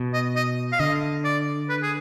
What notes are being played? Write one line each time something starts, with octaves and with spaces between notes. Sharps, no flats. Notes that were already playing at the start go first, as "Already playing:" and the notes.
Already playing: B2
D#5
D#5
F5
D3 D#5
D5
B4
G#4